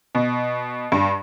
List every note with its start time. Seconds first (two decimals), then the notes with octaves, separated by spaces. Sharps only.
0.15 B2
0.92 G2